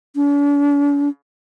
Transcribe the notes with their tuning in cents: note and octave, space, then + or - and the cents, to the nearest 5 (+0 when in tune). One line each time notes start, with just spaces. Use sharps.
D4 -45